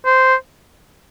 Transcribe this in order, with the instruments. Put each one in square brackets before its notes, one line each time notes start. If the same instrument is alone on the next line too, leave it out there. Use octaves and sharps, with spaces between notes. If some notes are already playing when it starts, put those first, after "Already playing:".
[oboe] C5